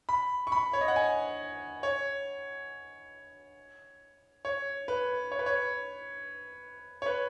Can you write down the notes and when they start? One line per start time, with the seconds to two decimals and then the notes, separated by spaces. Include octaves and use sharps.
0.09 B5
0.47 C#6
0.52 B5
0.73 C#5
0.81 D#5
0.88 F#5
0.96 G#5
1.83 C#5
4.45 C#5
4.88 B4
5.32 C#5
5.39 B4
5.46 C#5
7.02 C#5
7.06 B4